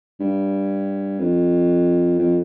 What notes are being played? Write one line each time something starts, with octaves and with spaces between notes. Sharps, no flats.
G2
F2
F2